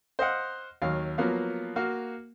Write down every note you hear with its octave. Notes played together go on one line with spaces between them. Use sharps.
C5 D#5 F5 F#5
D#2 F#3 F5
F3 F#3 A#3 B3 F5
A#3 F#4 F5